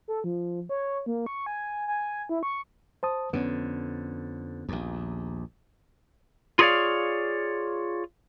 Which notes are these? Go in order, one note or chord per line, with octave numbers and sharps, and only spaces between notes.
A4
F3
C#5
A#3
C#6
G#5
G#5
E4
C#6
C5 A5 D#6
F2 D3 B3 C#4
A#1 D#2
F4 G#4 A#4 C#5 D5 F5